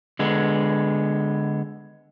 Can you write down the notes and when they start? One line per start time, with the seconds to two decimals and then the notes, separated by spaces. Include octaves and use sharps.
0.19 D3 G#3 B3